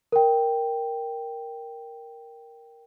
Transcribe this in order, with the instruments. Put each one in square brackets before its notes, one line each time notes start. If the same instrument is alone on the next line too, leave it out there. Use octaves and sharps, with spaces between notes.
[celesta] A#4 G5